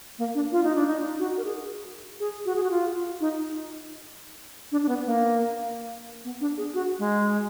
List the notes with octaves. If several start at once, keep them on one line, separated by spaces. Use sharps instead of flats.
A#3
D4
F4
D#4
D4
D#4
F#4
A#4
G#4
G#4
F#4
G#4
F#4
F4
D#4
D4
D4
B3
A#3
B3
D4
G#4
F#4
G#3